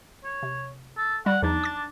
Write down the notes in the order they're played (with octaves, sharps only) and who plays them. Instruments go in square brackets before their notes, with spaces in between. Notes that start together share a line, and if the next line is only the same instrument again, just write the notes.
[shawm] C#5
[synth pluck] C3
[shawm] A4
[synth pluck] G3 [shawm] F#5
[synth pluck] E2 F3 D#4 [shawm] D4
[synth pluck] D6 A6